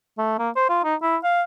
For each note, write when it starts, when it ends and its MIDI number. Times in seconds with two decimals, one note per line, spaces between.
0.18 0.36 57
0.38 0.50 58
0.56 0.64 72
0.69 0.79 65
0.84 0.95 63
1.02 1.17 64
1.23 1.42 77